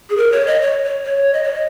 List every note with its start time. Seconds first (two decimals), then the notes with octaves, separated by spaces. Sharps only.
0.10 G#4
0.17 A#4
0.32 C#5
0.47 D#5
0.61 C#5
0.85 C#5
1.05 C#5
1.34 D#5
1.44 C#5
1.54 D#5